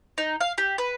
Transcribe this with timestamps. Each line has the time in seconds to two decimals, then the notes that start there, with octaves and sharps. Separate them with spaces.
0.18 D#4
0.40 F5
0.58 G4
0.78 B4